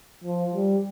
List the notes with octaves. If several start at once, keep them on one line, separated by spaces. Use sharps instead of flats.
F3
G3